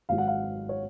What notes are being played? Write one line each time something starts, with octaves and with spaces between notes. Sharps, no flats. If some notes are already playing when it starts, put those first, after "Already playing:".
G#1 G#2 F#3 F5
F#5
F5
C#5